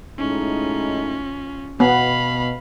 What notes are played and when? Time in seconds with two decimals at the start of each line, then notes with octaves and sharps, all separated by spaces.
0.19 A2 G#3 C#4 D#4 F4
1.80 B2 B3 F5 B5